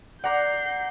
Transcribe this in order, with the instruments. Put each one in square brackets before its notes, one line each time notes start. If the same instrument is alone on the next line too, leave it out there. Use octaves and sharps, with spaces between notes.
[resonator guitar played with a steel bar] D5 [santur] F#5 A#5 D6 [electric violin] G6 C7